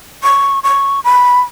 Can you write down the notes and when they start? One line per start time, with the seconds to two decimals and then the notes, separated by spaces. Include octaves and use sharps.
0.23 C#6
0.63 C#6
1.04 B5